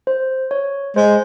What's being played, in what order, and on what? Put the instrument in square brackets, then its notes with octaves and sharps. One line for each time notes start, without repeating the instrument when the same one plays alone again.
[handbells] C5
C#5
[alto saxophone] G#3 [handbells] C5